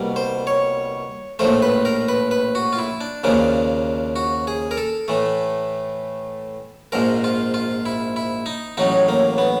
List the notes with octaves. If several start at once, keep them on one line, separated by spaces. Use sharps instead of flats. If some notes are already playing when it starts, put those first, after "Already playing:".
Already playing: C2 B2 G3 A#3
C5
C#5
A#1 A2 F3 A3 C5
B4
A#4
B4
B4
F#4
F4
E4
D4
D#2 C#3 F3 A#3 D4
F#4
G#4
A#4
A4
A2 E3 A3
A#1 G#2 F3 A#4
F4
F4
E4
E4
D#4
A1 A2 F#3 D#4
A#3
B3